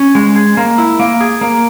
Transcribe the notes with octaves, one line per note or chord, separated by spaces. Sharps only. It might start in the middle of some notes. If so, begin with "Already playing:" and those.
Already playing: C#4
G#3
G#4
A#3
E4
A#3
G#4
A#3